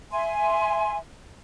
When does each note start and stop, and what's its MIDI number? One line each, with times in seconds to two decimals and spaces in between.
0.11 0.97 76
0.11 0.97 80
0.11 0.97 84